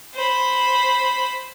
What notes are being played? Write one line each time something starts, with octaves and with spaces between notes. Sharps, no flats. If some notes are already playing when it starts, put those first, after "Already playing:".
C5 B5